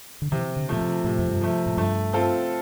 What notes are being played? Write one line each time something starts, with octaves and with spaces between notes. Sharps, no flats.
D3
C3 E3
D3
A#2 F3 A3
C3
A2 C3
F2
G2
F3 A3
A2
G2 A3
C4 F4 A4